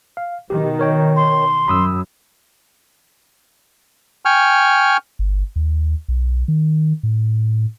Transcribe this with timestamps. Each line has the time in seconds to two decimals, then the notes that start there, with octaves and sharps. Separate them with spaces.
0.17 F5
0.50 B2 D#3 G4
0.79 A#4 C#5 G5
1.16 C6
1.68 F#2 B5 D#6 E6
4.25 G5 G#5 C#6 F6
5.19 G1
5.56 D#2
6.08 B1
6.48 D#3
7.03 A2